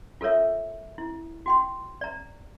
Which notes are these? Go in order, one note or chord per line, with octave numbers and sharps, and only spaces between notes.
F4 A4 A#4 C#5 E5
E4
F#4 G5 C6
D5 A#5